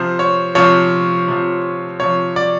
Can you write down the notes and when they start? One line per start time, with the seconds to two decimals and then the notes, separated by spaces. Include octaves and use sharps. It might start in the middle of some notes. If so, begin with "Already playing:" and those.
Already playing: C3 F3 C5
0.19 C#5
0.55 C3 F3 C#5
1.28 C3 F3
2.00 C3 F3 C#5
2.36 D5